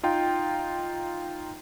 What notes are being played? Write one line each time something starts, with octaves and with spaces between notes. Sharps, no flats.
D#4 F4 G5